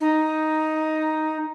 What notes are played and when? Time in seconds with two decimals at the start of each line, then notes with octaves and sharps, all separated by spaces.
0.01 D#4